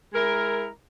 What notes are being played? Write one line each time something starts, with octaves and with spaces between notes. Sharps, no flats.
G#3 E4 A#4